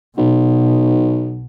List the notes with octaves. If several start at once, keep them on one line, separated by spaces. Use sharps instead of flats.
B1 B2